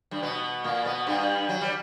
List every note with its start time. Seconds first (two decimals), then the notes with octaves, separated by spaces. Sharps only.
0.11 G2 G3
0.23 B2 B3
0.64 A#2 A#3
0.85 B2 B3
1.07 G2 G3
1.49 F#3
1.61 G3